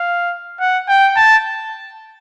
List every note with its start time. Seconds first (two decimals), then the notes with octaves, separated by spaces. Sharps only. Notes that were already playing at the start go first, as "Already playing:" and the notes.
Already playing: F5
0.60 F#5
0.88 G5
1.16 A5